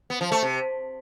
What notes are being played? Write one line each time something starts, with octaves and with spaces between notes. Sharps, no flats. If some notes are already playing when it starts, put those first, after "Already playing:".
B3
F3
A3
C3